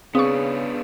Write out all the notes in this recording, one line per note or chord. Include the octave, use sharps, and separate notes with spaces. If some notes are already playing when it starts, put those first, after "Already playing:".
C#3 B3 C4 D4 G#4 F5 C#6 D#6